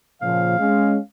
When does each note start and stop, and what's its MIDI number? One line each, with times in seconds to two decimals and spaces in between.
0.21 0.56 46
0.21 0.56 49
0.21 0.56 53
0.21 1.01 77
0.59 0.97 56
0.59 0.97 61